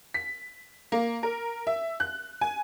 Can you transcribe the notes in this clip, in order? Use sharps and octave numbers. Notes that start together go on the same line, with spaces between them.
B6
A#3
A#4
E5
F#6
G#5